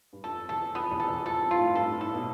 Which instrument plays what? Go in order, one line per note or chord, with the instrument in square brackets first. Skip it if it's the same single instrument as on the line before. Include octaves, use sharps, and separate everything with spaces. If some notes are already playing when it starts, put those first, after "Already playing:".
[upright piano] G2
[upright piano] F2 [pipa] A4
[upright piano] E2 [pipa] A4
[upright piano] F2 [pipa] B3
[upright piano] E2
[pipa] A4
[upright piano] E2
[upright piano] F2 [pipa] A4
[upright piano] G2
[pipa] F4
[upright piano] A2
[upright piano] G2 [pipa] A4
[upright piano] A2
[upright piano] A2 [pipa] A4
[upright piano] B2